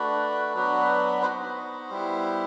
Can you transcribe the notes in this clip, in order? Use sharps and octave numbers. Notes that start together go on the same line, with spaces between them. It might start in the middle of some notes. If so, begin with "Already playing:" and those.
Already playing: A3 D4 F#4 B4
F#3 B3 D4 F#4
B3 D#4 F#4 C5
G3 B3 E4